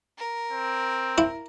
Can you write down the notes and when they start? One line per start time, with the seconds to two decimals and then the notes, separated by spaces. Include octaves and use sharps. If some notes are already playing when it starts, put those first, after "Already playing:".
0.18 A#4
0.51 C4
1.18 E4